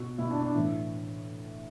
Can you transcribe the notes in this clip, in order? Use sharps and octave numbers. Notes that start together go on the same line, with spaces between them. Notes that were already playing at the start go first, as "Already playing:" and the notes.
Already playing: B2 F#4
B2 E4
D4
D4
A2 E3